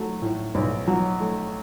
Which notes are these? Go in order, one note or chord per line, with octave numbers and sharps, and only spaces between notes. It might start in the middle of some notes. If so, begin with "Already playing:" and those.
Already playing: F#3 A3
A2
B1
F#3
A3